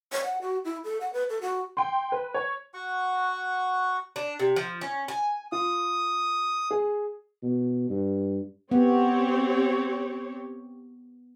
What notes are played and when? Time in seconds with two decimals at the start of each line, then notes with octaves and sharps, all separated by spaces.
0.12 C#5
0.24 F#5
0.42 F#4
0.65 E4
0.84 A4
1.01 F#5
1.13 B4
1.29 A4
1.41 F#4
1.77 G5 C6
2.12 B4
2.34 C#5
2.74 F#4 F#5 C#6
4.16 D4
4.39 C3
4.56 F3
4.81 C#4
5.08 G#5
5.52 F4 D#6
6.71 G#4
7.43 B2
7.89 G2
8.71 B3 C4 G4 C#5